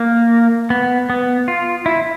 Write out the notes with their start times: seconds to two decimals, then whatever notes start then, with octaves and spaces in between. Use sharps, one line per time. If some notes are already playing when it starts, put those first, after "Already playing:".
Already playing: A#3
0.70 B3
1.10 B3
1.48 F4
1.86 E4